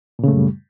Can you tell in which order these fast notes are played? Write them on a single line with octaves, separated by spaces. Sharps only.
A#2 C#3 A3 F#2 G3